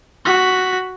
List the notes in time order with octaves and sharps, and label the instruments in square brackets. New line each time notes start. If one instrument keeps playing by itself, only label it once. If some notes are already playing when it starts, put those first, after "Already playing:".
[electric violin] F#4 B6